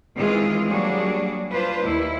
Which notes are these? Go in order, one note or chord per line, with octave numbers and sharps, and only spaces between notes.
D#3 E3 G#3 C4 F4 G#4
F#3 G3 A#3 D4 F#4 G#4
D4 F4 B4 C5
D#2 E4